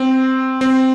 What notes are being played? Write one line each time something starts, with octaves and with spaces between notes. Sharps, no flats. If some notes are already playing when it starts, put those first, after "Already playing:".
Already playing: C4
C4